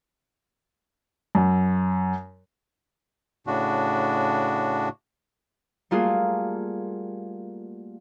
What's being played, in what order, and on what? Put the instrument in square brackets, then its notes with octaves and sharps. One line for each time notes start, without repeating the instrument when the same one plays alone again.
[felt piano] F#2
[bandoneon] A2 C#3 D4 F#4
[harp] G3 A3 A#3 F4 F#4 G#4